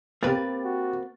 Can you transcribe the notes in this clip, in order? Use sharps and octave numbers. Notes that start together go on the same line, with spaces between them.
A#3 C4 G4 B4 A6
F#4